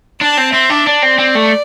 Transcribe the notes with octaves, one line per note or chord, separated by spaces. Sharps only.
D4 A5
C4
C4 E5
D4
D4 D5
C4
C4
A3